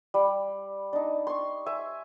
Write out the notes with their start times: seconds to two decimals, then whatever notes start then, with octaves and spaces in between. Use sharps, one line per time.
0.14 G3
0.93 D4 D#4
1.27 C6 C#6
1.66 E5 G#5